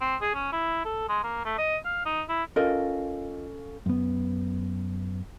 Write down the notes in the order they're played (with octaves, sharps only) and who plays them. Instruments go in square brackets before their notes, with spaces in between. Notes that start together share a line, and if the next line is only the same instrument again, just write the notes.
[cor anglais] C4
G#4
C#4
E4
A4
G#3
A#3
A3
D#5
F5
D#4
E4
[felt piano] C#4 A4 F5 [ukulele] F4 A#4 D#5
[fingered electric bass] F#2 B3